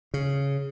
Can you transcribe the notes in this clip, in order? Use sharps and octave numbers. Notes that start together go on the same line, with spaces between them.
C#3